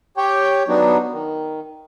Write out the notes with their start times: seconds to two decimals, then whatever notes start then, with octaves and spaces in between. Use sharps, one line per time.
0.17 G4 C#5 G5
0.68 F#3 B3 D4 D#4 F#4
1.12 D#3